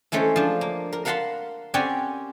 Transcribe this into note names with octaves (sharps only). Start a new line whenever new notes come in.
E3 G#3 A3 C#4 C5
F3 D4
A#3
A#4
A#4 F5 F#5 A5 B5 C6
C4 C#4 G4 D5 F#5 G#5